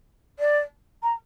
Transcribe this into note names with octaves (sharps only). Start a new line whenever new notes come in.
D5
A#5